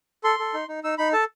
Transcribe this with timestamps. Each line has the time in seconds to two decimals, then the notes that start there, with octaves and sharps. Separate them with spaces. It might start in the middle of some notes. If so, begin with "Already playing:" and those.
0.24 A4 C6
0.39 A4
0.54 D#4
0.68 D#4
0.84 D#4 E6
0.98 D#4 B5
1.13 A4 A5